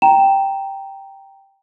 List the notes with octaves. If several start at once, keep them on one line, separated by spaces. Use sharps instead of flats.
G5 A#5 E7